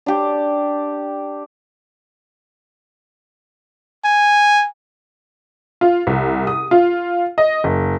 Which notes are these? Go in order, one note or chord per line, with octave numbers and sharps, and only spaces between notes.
D4 G4
G#5
F4
C2
D#6
F4
D#5
F#1